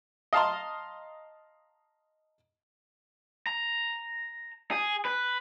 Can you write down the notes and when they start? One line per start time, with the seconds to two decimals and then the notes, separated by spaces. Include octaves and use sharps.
0.33 D#5 F5 A5 A#5 C6
3.47 A#5
4.71 G#4
5.05 B4